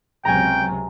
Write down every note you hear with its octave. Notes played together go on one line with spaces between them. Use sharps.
C#2 C3 F#3 G5 G#5 A#5